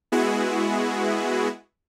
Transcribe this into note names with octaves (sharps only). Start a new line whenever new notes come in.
G#3 B3 E4 F#4 G#4